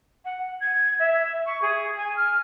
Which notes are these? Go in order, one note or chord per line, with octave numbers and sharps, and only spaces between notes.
F#5
G#6
E5
C#6
G#4
G#5
F6